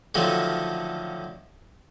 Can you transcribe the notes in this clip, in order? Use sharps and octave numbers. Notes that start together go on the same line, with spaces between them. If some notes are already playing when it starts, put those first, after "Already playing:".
D3 D#3 F3 F#3 A3